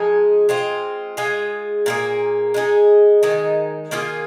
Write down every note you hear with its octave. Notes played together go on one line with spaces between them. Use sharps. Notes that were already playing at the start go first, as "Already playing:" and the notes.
Already playing: F3 G#3 D#4 G#4
G#3 C4 F4
G#3 F4 G#4
A#2 A#3 G#4
G#3 D#4 G#4
D#3 G#3 D#4
D#3 A#3 F4 G#4